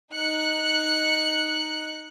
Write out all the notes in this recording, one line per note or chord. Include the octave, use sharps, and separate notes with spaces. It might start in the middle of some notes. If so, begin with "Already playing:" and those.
D#4 F#6 C#7